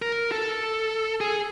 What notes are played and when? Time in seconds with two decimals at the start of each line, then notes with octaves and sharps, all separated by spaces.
0.02 A#4
0.32 A4
1.21 G#4